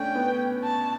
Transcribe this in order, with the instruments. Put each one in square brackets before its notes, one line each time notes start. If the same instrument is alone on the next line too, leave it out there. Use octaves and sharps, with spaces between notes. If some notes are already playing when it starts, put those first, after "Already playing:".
Already playing: [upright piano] A3 C#4 D4 [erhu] G5
[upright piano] B3
[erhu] A5